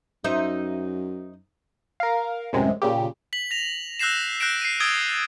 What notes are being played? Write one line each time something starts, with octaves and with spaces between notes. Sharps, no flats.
F#2 D#4 C5 E5
A#4 F5
A1 F#2 C3 G#3
A#2 C#3 G4
B6 F#7
A#6 F7
E6 F#6 G6 A#6 C7 E7
F#6 G6 A#6 C7 D7 E7
C7 D#7
D#6 E6 G#6 A6 D7 G7